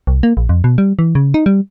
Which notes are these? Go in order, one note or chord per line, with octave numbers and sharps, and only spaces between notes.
C2
A#3
A#1
F2
B2
G3
E3
C#3
D#4
G3